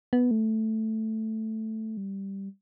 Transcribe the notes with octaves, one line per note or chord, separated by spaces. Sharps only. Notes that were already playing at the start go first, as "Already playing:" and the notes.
B3
A3
G3